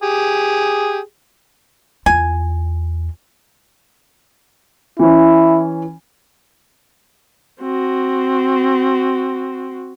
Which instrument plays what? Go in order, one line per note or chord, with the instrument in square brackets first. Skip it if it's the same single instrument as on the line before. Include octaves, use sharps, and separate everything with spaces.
[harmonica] G4 G#4
[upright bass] E2 F4 [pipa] G#5
[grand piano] E3 C#4 [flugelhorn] E4
[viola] C4 F#4